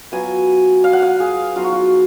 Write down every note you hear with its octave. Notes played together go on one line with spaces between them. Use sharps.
F#3 B3 F4 G#5
F5
F#5
F5
G#4
F#3 B3 D#4 F4
F#4
F4